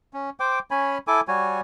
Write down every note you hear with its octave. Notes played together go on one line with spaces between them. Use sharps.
C#4
C5 G5 D6
C#4 C#5 G#5 B5
E4 A4 G#5 D6
G3 F#4 C#5 G#5